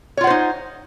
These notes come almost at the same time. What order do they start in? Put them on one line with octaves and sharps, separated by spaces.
C#5 F4 F#5 C5 D#4